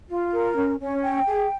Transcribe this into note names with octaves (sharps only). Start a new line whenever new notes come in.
F4
A#4
C#4
C#4
G5
G#4